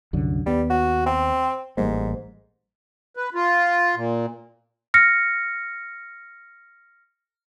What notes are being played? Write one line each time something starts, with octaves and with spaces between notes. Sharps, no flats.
C2 F#2 D3
D#2 G3 B3
F#4
C4
A1 G#2 G3 A#3
B4
F4
A#2
F6 A#6 C#7